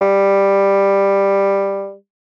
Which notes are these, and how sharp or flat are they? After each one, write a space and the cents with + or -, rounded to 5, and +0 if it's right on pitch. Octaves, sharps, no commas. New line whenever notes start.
G3 +10